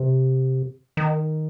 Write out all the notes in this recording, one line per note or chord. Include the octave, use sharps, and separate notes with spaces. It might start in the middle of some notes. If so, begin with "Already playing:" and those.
Already playing: C3
D#3